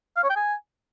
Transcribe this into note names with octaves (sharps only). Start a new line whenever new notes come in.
F5
C#5
G5
G#5